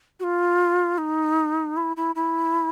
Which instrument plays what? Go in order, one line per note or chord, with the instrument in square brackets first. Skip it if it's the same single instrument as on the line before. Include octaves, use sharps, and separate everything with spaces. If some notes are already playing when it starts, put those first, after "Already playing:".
[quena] F#4
F4
D#4
E4
E4
E4